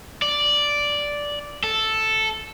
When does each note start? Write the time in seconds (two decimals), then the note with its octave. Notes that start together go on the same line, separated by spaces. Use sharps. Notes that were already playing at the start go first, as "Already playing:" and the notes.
0.22 D5
1.64 A4